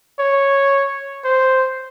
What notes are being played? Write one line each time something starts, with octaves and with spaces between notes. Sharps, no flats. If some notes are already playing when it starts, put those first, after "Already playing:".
C#5
C5